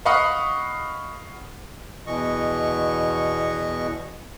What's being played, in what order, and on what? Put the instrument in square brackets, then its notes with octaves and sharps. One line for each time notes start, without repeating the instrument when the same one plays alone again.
[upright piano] D#5 F5 F#5 B5 C#6 D#6
[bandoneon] E2 B2 E3 D#5 C#6